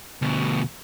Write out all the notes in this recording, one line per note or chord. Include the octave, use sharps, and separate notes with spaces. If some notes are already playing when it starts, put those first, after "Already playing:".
D2 B2